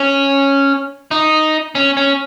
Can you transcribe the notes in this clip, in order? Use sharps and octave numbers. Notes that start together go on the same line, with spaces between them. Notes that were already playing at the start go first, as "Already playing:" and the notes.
Already playing: C#4
D#4
C#4
C#4